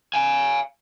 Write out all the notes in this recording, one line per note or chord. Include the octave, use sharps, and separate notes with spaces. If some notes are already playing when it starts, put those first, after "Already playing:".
F5 G#5